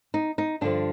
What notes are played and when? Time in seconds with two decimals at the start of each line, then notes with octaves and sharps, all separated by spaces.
0.14 D#4
0.38 D#4
0.61 G2 D3 F3 D4